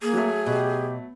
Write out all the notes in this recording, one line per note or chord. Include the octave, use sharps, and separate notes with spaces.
A#3 G#4
F#3 A3
B2 G4